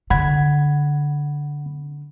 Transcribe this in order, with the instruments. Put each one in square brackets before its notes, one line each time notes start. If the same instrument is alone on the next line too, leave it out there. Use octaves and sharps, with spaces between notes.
[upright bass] D3 [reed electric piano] F#5 B5 G#6